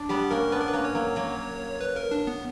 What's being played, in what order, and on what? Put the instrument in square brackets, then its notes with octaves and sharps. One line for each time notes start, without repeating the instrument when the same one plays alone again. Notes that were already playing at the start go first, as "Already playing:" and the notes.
Already playing: [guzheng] D4
[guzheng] G3 B3 [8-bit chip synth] G4
[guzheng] A#3 C#4 [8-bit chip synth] A#4
[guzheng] B3 D4 [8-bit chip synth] B4
[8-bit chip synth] A#4
B4
[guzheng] A#3 C#4
[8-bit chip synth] C#5
[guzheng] F#3 A#3
F#3 A#3
[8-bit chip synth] B4
A#4
D4
B3